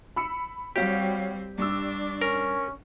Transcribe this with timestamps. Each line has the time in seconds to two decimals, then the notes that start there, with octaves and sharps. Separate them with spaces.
0.16 B5 E6 C#7
0.76 G3 C4 F#4 G4 C#5 F5
1.58 G2 D4 D5 E6
2.21 C#4 A#4